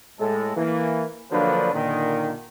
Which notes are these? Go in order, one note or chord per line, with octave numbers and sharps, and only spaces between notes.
A2 G#3 A4
E3 A#3
D3 F3 F#3 A#3 D4 B4
A#2 D3 D#3